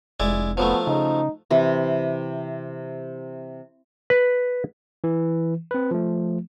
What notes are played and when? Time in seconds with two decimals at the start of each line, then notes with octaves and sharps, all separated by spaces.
0.20 F1 G#3 E4 D5
0.57 F3 F#3 A3 B3
0.87 C#3 D#4
1.51 C3 E3
4.10 B4
5.04 E3
5.71 C4 B4
5.91 F3 A3